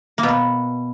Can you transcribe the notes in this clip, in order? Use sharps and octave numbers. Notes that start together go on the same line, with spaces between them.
A#3
B2
B3